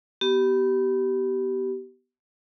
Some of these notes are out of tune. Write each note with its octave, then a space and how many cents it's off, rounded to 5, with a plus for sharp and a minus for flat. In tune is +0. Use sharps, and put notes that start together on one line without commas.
B3 +0 G4 -25